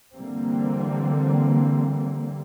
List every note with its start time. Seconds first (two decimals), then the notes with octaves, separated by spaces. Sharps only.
0.13 D3 E3 G3 A#3 C4